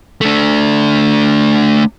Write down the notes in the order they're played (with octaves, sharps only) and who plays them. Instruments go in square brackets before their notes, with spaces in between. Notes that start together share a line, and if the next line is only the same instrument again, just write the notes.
[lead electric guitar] A3 D4